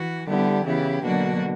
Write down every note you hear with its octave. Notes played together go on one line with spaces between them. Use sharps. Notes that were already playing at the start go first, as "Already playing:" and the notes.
Already playing: E3 F#4
D3 G3 B3 E4 G4
C#3 E3 B3 E4 G4
B2 D3 F#3 A#3 D4 F#4